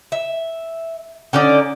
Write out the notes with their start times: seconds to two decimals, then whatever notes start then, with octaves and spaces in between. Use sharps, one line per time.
0.12 E5
1.33 D3 C#4 D#4 D5